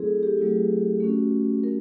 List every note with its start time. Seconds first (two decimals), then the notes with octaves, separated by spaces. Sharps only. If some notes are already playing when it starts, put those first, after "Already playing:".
Already playing: F#3 A3 C4 E4 G#4 A4
0.23 G4
0.38 F#3 A3 C4 E4
1.00 A3 C#4 F#4
1.63 A3 C#4 A#4